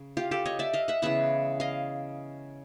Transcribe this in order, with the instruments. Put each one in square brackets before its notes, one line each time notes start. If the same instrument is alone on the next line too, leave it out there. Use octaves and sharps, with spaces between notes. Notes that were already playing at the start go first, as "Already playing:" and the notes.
Already playing: [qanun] C#3
F4 G4
G4 A4
C#5 D#5
D5 E5
D#5 F5
E5 F#5
C#3 E3 G#3 B3 E5 F#5
D#5 F5